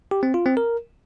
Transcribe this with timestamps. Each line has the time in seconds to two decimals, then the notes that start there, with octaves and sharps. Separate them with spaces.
0.11 G4
0.23 C4
0.34 F4
0.46 C4
0.57 A#4